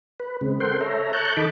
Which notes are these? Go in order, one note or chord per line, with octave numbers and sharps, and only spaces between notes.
B4
C#3 G#3 C4
A4 A#4 C5 F#5 G5 C6
A4 C#5 E5 A#5
A5 A#5 C#6 F#6 G6
D#3 A4 D#5 B5 D6